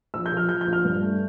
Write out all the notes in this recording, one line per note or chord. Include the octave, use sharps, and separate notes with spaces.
A#1 E6
G6
F3
F6
F3 G6
G6
A#1
F6
G2
A3